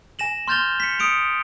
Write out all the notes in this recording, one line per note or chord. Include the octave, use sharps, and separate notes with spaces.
G#5 A#6 E7 F#7
C6 F6 G6 A6 F7 G7
B6 C#7
D#6 C#7 D7 F7